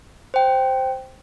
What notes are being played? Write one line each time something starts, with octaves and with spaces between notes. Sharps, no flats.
C5 G5